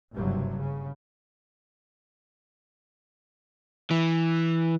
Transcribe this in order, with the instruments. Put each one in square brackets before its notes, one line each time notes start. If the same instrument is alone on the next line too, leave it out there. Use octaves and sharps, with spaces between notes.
[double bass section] F#1 G2 C3 F#3
C#3
[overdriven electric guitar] E3